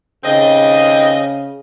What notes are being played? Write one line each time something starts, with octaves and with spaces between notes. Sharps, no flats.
D#2 C#3 C4 D#5